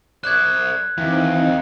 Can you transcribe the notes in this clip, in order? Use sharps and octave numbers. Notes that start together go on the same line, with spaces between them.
C5 D5 F#6 G#6
D#2 E3 C4 D#4